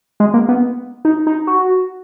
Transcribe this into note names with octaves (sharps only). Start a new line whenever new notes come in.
G#3
A#3
B3
D#4
D#4
F#4